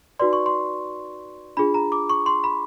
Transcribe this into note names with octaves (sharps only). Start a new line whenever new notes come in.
D#4 F#4 B4 D5 C6
C#6
C6
D4 F4 G#4 B5
A#5
D6
C#6
C6
B5